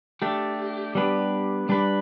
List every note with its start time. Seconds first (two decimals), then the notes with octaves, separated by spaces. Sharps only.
0.22 A3 D4 G4
0.95 G3 B3 D4 G4 B4
1.69 G3 D4 B4